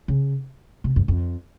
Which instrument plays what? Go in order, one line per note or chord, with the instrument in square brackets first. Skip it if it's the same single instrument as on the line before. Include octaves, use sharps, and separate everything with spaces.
[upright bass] C#3
C3
F#2
F2